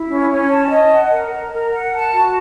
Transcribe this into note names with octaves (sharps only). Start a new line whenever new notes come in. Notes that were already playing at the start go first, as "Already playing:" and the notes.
Already playing: E4
C#4
C#4
A5
D#5
F#5
A#4
A#4
A#4
F#5
A5
F#4